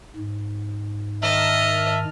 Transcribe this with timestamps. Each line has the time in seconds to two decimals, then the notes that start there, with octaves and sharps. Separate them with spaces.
0.16 G#2
1.22 D#3 D#5 E5 A5 F6